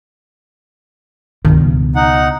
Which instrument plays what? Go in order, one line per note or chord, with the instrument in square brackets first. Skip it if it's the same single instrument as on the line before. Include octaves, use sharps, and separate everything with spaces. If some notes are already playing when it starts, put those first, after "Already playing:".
[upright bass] C#2 B2 [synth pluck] G2 D#3
[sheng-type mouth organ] D#4 F#5